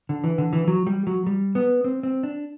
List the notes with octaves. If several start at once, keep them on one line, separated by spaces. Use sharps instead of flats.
D3
E3
D3
E3
F#3
G3
F#3
G3
B3
C4
C4
D4